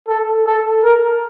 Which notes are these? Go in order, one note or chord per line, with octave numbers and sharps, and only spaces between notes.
A4
A4
A#4